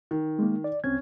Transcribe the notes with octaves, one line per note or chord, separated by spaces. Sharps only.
D#3
G#3 A#3
D5
C2 C4 C#4 G#6